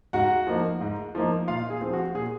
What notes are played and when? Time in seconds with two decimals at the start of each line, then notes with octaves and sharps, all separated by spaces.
0.13 G#2 F#4 F#5
0.47 F3 A#3 D#4
0.81 G#2
1.15 F3 A#3 D#4
1.48 A#2 F4 F5
1.70 G#4
1.81 F3 C4
1.93 F#4
2.15 A#2 G#4